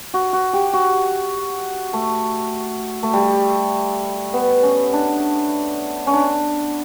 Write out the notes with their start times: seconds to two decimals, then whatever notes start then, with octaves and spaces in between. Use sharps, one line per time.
0.14 F#4
0.33 F#4
0.53 G4
0.73 F#4
1.93 A3
3.03 A3
3.13 G3
4.33 B3
4.63 C#4
4.93 D4
6.07 C#4
6.13 D4